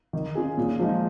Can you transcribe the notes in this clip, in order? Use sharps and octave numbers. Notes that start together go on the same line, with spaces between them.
D#3
C#4 F4 G#4
A#2
F3 G#3 D#4